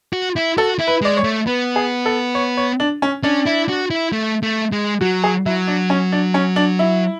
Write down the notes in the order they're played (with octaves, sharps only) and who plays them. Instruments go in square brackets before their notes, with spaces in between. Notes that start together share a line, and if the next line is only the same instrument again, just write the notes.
[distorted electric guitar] F#4
E4
[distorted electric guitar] F#4 [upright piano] A4
[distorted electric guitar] E4
[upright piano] B4
[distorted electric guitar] G#3 [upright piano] D5
[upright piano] C#5
[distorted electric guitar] A3
[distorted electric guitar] B3 [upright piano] B4
[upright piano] G#4
A4
C#5
C#5
D4
C#4
[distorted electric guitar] C#4 [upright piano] D4
[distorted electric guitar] E4
F#4
E4
A3
A3
G#3
[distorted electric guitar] F#3 [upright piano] F#4
[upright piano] G#4
[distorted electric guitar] F#3 [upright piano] E4
[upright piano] D4
C#4
D4
C#4
D4
E4